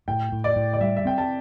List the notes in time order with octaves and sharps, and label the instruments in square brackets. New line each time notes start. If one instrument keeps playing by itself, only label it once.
[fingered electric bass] A2 [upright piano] G5
[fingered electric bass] A2
[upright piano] D5
[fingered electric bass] A2
[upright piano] D5
[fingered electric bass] G3 [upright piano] E5
[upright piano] E5
[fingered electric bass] C4 [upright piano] G5
[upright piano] A5